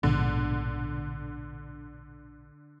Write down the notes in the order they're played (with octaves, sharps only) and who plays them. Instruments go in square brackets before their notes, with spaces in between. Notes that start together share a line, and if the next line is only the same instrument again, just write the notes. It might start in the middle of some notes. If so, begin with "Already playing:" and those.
[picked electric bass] A#1 G#2 B2 [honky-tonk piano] D3